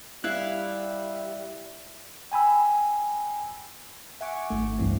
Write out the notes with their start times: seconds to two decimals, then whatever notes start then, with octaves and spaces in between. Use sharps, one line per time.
0.24 G3 E4 E5 F5 F#6
2.32 G5 G#5 B5 E6
4.21 E5 F#5 G#5 C#6 D6
4.50 G#1 A3
4.78 C#2 G2 E3 C4